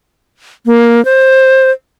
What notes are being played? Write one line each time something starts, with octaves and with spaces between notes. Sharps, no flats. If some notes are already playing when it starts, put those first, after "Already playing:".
A#3
C5